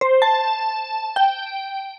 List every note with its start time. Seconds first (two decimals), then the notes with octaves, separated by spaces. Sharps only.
0.01 C5
0.22 A5
1.16 G5